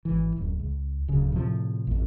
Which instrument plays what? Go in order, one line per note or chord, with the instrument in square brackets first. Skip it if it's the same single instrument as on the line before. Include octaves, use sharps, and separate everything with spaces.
[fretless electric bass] G#1 E3
D1 F#2
C#2
D1 C#3
A2 C3 D#3 F3
A1 F2